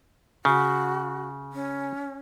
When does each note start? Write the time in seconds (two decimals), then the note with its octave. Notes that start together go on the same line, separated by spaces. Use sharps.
0.45 C#3 F#4
1.53 C#4